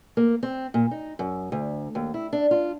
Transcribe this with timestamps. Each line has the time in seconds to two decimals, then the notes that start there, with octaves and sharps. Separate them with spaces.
0.17 A#3
0.43 C4
0.74 A#2
0.91 D#4
1.19 F#2
1.52 D2
1.95 D#2
2.14 E4
2.33 D4
2.51 F4